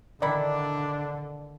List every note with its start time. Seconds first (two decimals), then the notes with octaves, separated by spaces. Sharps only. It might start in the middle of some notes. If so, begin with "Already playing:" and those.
0.22 D3 D#3 D4 E4 D5